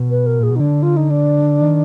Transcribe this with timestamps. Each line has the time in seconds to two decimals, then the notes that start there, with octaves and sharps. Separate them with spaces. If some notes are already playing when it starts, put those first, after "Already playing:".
Already playing: B2
0.10 B4
0.26 A#4
0.39 A#2 G#4
0.50 B2
0.56 D#4
0.60 D3 D4
0.83 F4
0.97 D#4
1.10 D4
1.61 D#3